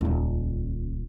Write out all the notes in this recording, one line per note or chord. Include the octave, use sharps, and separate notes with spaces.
D#1 C#2